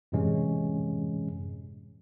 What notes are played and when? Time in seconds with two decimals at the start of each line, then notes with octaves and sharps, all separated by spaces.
0.12 F#2 A2 C3 E3 G#3 C#4